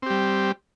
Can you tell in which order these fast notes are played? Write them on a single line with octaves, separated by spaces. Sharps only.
C4 G4 G3